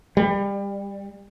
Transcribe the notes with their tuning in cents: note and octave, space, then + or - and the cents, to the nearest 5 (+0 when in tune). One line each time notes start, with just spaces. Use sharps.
G3 +25